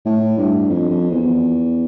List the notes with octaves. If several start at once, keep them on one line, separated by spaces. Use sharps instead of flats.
A2
G2
F2
F2
E2